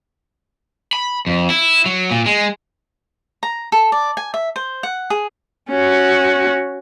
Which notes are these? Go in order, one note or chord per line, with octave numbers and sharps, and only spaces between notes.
B5
F2
E4
F#3
A#2
G#3
A#5
A4
D5
G#5
E5
C5
F#5
G#4
C#4 F#4